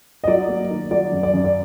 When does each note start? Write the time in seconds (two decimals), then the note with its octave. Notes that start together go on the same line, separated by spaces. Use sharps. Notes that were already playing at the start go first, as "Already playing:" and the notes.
0.24 D#5
0.27 F#3 D5
0.49 A#3
0.70 D#3
0.91 F#3 D5
1.12 F#2
1.23 D5
1.33 F#2
1.44 D5